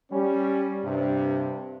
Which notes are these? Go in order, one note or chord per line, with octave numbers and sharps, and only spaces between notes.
G3 C#4
G2 C3